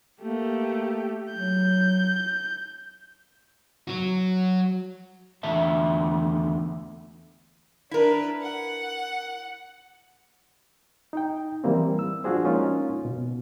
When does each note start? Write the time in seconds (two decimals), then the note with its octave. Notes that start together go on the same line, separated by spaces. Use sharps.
0.22 A3 A#3 G4
1.33 F#3 G6
3.88 F#3 F#4
5.43 E2 D3 A3 E5 A5
7.91 D4 E4 A#4 B4
8.42 F#5
11.13 D#4 G5
11.64 E3 G3 A#3 C4
11.99 E6
12.24 F3 D4 F4 F#4 G#4 C5
12.44 G#3 A#3 C#4 D#4 F4
13.05 B2